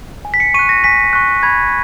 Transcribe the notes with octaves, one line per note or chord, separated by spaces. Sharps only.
G#5
B6
C#7
C#6 F#6 D#7
A#6
G#5 B6
C#6 F#6
B5 G#6